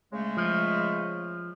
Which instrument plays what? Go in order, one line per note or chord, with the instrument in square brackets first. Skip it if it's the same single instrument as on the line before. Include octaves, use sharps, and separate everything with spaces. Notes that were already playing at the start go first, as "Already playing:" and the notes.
[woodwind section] C#3 G#3 A3
[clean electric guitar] F3